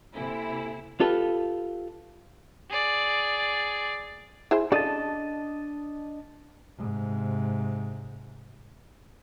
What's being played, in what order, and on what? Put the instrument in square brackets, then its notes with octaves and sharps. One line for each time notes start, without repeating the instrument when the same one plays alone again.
[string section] C3 E4 [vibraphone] A#3 A4 G#5
[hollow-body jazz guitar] F4 G4 A4 B4
[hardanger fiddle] G#4 D5
[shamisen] E4 G#4 C5
[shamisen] C#3 A4 D5 [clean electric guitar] D4 D#5 A5
[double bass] G#2 C3